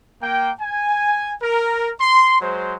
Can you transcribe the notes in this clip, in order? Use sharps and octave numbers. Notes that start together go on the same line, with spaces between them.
A#3 G5
G#5
A#4
C6
F#3 G#3 C5